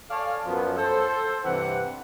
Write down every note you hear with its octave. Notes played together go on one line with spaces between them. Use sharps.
A4 C#5 D5 F5 G#5 A5
F#2 F3 B3
A4 C5
G2 C3 E3 C4 F#5